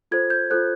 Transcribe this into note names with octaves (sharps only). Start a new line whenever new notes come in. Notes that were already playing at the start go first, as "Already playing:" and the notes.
F4 A4 C5 G#6
G6
F4 A4 C5 F#6